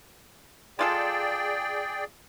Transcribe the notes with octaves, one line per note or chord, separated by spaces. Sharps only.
G#3 F4 G#4 A4 D5 G5